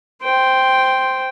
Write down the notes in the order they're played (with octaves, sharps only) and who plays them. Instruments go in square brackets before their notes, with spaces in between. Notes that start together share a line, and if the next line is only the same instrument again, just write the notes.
[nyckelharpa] C5 G5